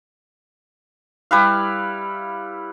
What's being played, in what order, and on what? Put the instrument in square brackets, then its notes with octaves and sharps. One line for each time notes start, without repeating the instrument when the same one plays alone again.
[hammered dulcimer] G3 E4 B4 F5